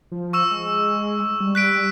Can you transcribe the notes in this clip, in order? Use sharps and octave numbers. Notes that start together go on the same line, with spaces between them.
F3
C#6 E6 E7
G#3
G3
F#6 B6 D7